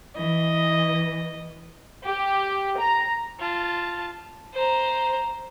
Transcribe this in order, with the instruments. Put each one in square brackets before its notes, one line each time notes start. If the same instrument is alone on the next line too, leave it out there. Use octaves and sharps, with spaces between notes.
[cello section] E3 [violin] D#5
[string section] G4
A#5
[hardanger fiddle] F4 A5
[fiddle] C5 A#5